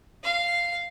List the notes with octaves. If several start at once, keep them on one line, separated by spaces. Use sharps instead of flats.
F5